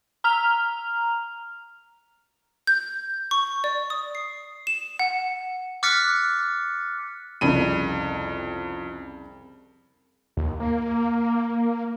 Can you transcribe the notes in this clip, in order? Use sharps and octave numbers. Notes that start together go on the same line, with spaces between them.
A#5 F6 F7
G6
C#6
D5
D#6
C7
E7
F#5
D6 F6 F#6 A6 B6 C#7
C2 F2 C#3 D#7
D#2
A#3